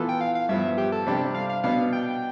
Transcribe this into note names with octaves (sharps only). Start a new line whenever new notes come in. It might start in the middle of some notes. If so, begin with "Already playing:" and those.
Already playing: E3 B3 F4 A4
G5
F5
F5
G2 F3 B3 E5
G4
A4
C3 G3 D4 G4
F5
F5
B2 B3 D4 F5
G5